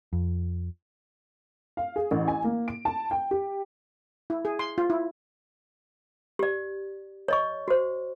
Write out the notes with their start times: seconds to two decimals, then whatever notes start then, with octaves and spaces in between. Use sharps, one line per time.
0.13 F2
1.77 F5
1.96 G#4
2.11 A1
2.28 G#5
2.44 A#3
2.68 D7
2.85 A5
3.11 G5
3.31 G4
4.30 E4
4.45 G#4
4.59 C6
4.78 F4
4.90 E4
6.39 G4 D5
7.28 C#5 D#5 C#6
7.68 F#4 C5